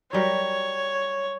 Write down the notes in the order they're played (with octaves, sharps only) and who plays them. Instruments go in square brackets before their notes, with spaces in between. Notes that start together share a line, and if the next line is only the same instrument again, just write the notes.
[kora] F#3 G3 A#4 [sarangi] C#5